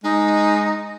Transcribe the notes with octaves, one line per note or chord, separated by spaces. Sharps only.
G#3 D#4